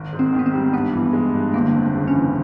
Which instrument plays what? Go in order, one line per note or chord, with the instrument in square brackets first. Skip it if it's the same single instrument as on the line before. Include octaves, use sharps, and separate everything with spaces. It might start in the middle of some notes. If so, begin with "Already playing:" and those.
Already playing: [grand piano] G#1
G#2
[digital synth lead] C4
[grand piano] D#3
[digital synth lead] B3
C4
[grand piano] G3
[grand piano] G2 [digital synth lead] B3
[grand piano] E3
G#3
G2
[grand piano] G1 [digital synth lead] A#3
[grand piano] F2
C#3
[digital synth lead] C#4
[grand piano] E3